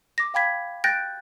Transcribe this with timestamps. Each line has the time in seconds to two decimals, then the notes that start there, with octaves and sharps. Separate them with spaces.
0.18 D6 A#6
0.34 F5 G5 B5 G#6 B6
0.84 G5 F#6 G6 A6 A#6 D7